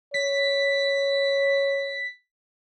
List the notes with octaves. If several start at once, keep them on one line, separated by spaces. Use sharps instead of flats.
C#5 B6